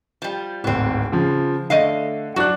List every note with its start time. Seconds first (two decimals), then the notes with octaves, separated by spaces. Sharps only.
0.22 F3 G3
0.64 D1 G#1 B3 C4
1.12 C#3 F3
1.70 D3 A3 D#5 F5 D#7
2.36 F#3 D4 F#4 F#6